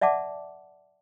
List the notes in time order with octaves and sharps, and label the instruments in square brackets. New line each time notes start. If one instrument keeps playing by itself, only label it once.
[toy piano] D5 E5 F#5 A5 D6